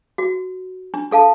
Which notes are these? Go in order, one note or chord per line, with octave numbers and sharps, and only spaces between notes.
F#4
D4
D4 A4 F5 A5